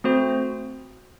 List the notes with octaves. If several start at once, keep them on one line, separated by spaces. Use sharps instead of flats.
A3 C4 F#4 C5